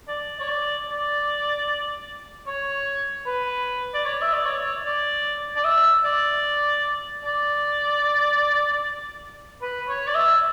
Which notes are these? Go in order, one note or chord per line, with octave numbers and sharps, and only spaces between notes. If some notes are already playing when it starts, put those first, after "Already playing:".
D5
C#5
D5
D5
C#5
B4
D5
C#5
E5
D5
C#5
D5
D5
E5
D5
D5
B4
C#5
D5
E5